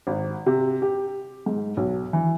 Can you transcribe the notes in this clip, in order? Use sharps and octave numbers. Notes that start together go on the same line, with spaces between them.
G#1
C3
G4
G#2
B1
E3